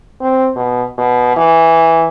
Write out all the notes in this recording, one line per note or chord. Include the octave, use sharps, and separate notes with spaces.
C4
B2
B2
E3